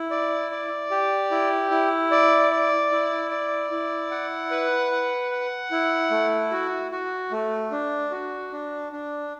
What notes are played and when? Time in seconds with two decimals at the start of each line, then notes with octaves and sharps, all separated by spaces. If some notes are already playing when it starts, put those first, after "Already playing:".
Already playing: E4
0.11 D5
0.51 D5
0.91 G4
1.31 E4
1.71 E4
2.11 D5
2.51 D5
2.91 E4
3.31 D5
3.71 E4
4.11 F#5
4.51 B4
4.91 F#5
5.31 F#5
5.71 E4
6.11 A3
6.51 F#4
6.91 F#4
7.32 A3
7.71 D4
8.11 F#4
8.52 D4
8.92 D4